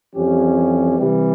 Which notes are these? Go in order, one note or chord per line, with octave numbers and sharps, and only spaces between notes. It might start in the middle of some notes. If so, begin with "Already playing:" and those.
F2 E3 G3 C#4 G4
C3 E3 G3